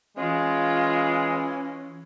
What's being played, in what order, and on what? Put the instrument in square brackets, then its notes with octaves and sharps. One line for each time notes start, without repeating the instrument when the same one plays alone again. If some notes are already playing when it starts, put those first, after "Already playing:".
[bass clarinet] E3 [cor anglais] G#3 [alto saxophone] C#4 [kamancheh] F4